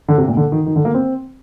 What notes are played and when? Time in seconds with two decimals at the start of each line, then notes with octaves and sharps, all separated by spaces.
0.08 D3
0.18 C3
0.28 A#2
0.37 D3
0.52 D#3
0.66 D#3
0.76 D3
0.85 A#3
0.94 C4